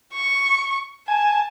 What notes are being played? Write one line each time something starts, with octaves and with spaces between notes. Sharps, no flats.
C#6
G#5 A5